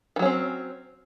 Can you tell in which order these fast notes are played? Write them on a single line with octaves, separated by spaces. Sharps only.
D#3 F#3 C#4 C4